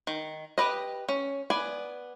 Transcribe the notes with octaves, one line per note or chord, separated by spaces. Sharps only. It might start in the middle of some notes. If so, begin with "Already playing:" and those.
D#3
G4 B4 D#5
C#4
B3 D5 G#5